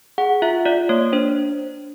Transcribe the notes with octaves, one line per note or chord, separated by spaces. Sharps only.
G#4 F#5
F4 E5
F4 D5
A#3 C#5
D4 C5